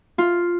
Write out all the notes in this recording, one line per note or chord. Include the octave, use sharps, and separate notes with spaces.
F4